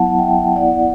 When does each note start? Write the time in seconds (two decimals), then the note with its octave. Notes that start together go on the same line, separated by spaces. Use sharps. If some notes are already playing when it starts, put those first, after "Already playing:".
Already playing: F#3 B3 E4 F#5 A5
0.19 E5 G5
0.56 B3 E4 D5 F#5